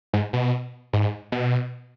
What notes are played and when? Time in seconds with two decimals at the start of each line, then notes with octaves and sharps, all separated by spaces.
0.13 G#2
0.33 B2
0.93 G#2
1.32 B2